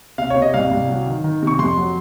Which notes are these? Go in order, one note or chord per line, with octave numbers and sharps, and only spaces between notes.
C3 F5
C#5
C3
D#5
C2 F5
C2
F#3
D#3
D#3
C3
C#6
F2 C6
F#3